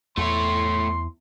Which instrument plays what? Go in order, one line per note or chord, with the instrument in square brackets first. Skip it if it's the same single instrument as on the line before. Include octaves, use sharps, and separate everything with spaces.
[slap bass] E2 [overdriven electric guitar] A3 C#5 [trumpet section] C6